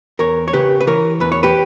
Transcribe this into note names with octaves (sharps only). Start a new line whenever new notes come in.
E2 A#4 C#5
C#5
C#3 G4 B4
B4
E3 A#4 C#5
E2 B4
C#5
G4 B4